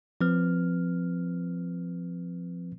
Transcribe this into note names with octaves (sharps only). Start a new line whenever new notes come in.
F3 C4 B4 F6